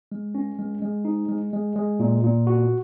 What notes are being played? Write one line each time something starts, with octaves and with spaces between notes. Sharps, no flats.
G#3
C#4
G#3
G#3
D#4
G#3
G#3
G#3
A#2
A#2
F#4